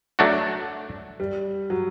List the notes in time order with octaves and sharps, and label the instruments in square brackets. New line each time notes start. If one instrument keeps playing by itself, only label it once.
[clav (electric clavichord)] F#3 A3 D4 F#4
[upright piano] G3
F#3